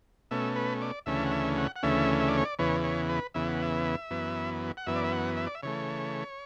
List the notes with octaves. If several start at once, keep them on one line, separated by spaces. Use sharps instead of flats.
B2 A3 C#4 E5
B4
D5
D2 C#3 E3 A3 C#4 E5
F#5
E5
F#5
F#5
D2 C#3 E3 A3 C#4 E5
E5
D5
C#5
D5
E2 C#3 E3 B3 C#5
C#5
B4
E2 C#3 E3 B3 E5
F#5
E5
F#2 E3 B3
F#5
F#2 E3 B3 E5
D5
E5
F#5
E5
D5
E5
C#3 E3 A3 C#5